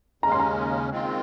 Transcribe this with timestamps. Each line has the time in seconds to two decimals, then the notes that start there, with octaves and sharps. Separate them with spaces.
0.23 D#2 C#3 G#3 C#4 A#5
0.32 C6
0.40 A#5
0.90 D#3 G#3 C4 F4